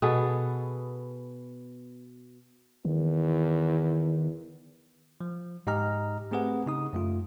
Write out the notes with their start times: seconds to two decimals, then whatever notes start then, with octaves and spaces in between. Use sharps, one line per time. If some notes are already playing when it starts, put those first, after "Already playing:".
0.02 B2 B3 G#4 A4
2.85 E2 D#3
5.21 F3
5.67 G#2 G4 D#5 A#5 F6
6.31 A3 C4 G4 G#4 B4 F#5
6.66 C#3 D#4 D#6
6.93 F#2 A3 F4